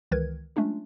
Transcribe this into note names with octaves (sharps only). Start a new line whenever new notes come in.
C#2 D#3 E3 A#4 B4 G#6
F#3 G#3 A3 C#4 D4 F4